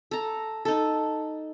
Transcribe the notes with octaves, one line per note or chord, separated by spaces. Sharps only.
A4 A#5
D#4 A4